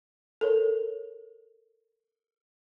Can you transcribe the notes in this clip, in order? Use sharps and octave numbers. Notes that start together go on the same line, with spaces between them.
A4 A#4 C#5